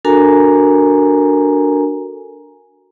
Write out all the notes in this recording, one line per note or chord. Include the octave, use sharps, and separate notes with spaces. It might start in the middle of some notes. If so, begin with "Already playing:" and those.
D4 F#4 A4 A#4 G#5 A#5